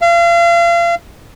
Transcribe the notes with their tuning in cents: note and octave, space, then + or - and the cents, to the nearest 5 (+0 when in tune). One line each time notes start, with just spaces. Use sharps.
F5 -35